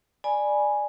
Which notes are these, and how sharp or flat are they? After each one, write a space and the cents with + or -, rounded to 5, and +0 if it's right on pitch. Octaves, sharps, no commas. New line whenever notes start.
D5 +15 G#5 +0 B5 -20